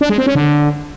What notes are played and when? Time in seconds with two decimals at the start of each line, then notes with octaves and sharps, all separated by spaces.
0.01 D4
0.09 G#3
0.18 C4
0.27 C#4
0.35 D3